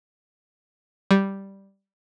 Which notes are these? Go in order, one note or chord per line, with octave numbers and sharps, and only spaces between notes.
G3